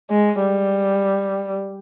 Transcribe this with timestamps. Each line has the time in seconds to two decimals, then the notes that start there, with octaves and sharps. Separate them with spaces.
0.10 G#3
0.42 G3